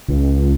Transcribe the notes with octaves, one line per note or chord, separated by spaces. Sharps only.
C#2